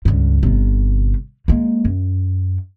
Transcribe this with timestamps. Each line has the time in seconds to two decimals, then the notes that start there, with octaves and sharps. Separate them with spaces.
0.05 C#2 G2
0.43 G1 C3
1.48 G#3 A#3
1.85 F#2